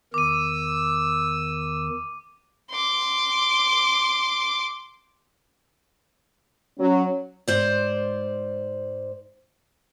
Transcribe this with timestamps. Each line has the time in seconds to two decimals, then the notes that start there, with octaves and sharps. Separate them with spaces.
0.14 E2 D#3 D6 E6 D#7
2.71 C6 D6
6.79 F#3 C#4
7.48 G#2 C5 D5